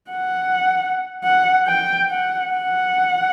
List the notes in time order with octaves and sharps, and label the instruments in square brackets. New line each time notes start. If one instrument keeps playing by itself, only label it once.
[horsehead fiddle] F#5
F#5
G5
F#5
F#5